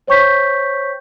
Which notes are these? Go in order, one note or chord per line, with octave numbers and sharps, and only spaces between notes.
C5 C#5 G5 C#6 G6 B6